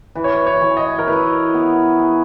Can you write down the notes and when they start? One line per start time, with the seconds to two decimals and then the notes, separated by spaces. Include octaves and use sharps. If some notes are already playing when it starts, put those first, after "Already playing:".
0.15 E3 B4
0.24 C#5
0.33 B4
0.47 C#5
0.61 E3
0.77 D#5
0.99 A#4
1.08 E4 B4
1.54 B3
1.99 G#4